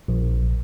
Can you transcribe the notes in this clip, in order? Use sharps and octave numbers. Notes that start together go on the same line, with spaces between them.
A#1